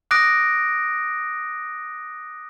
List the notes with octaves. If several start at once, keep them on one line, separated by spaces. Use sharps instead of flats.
D6 D#6 F#6 A#6 D7